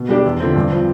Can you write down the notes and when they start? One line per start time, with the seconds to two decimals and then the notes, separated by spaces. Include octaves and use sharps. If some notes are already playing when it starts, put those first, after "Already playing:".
Already playing: B2
0.09 G3 D4 G4
0.25 E2
0.40 D3 F3 A3 C4
0.56 G2
0.72 F3 C4